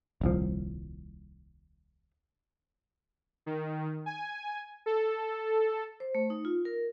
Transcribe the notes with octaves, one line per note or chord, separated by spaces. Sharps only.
D#1 C2 F3
D#3
G#5
A4
C5
A3
D#4
F4
A#4